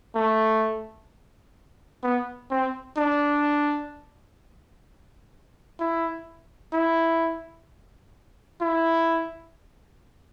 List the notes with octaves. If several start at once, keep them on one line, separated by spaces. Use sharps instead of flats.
A3
B3
C4
D4
E4
E4
E4